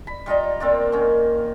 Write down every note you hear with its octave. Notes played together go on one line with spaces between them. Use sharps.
B5
G3 F4 D#5 A#5
A#2 C4 F4 D5
D#3 C#4